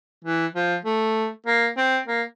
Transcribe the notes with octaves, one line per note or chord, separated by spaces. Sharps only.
E3
F3
A3
A#3
C4
A#3